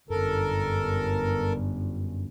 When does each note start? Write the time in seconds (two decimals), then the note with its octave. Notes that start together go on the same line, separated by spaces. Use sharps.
0.10 G1 F#2 A4 A#4